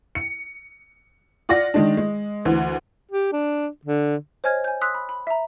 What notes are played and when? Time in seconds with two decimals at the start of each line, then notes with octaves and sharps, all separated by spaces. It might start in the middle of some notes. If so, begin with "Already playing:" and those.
0.15 C#7
1.49 F4 D5 F#5 A#6
1.74 D#3 G#3 D4
1.97 G#3
2.45 D2 E3
3.12 G4
3.33 D4
3.85 D3
4.44 C5 C#5 D#5 G#5 F6 G#6
4.64 G#5 G6
4.81 C6 D#6 E6 F#6 B6
4.94 B5
5.09 B5
5.27 E5 A#5